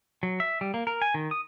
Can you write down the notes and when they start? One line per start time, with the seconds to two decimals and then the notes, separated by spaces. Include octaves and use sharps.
0.23 F#3
0.40 E5
0.61 G3
0.74 A#3
0.87 A#4
1.02 G#5
1.14 D#3
1.31 D#6